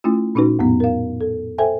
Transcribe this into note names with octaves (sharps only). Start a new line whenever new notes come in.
A3 C#4 E4 F4
A#2 C#4 D#4 F#4 B4
F2 A2 F#3 B3
A#4 F5
A4
A4 C5 E5 G5 G#5